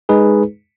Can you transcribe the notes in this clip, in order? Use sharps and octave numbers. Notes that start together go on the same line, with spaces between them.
G#3 D#4 G#4 B4